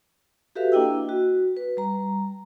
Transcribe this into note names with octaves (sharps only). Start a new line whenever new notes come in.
F#4 G4 A4 B4 E5 F5
A#3 D4 E4 D#5 G5 E6
F#4
B4
G3 A#5